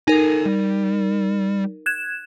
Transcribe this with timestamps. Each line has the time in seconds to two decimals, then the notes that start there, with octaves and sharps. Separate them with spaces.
0.08 D#4 A4 A#4 G#5
0.46 G3
1.86 F#6 G#6 E7